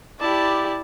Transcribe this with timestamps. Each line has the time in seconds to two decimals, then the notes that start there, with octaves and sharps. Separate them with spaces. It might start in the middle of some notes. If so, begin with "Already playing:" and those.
0.20 E4 G4 D5 A5